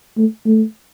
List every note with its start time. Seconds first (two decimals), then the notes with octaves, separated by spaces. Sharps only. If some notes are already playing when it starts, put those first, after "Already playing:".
0.18 A3
0.46 A3